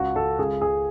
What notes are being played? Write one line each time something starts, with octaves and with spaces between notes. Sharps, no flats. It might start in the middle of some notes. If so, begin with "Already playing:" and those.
Already playing: C#2 F#4
C#2 A4
C#2 G#4
C#2 G#4